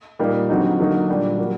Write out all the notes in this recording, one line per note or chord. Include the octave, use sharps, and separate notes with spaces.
A#2 G3 A#3 D#4
D3 F#3 C4 D#4
D3 F#3 A#3 D#4
A#2 G3 D4
F#3 A#3